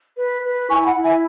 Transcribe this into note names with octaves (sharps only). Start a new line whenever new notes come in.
B4
B4
E4 G#5 C#6
G#5
F#5 B5
E4
E5 G#5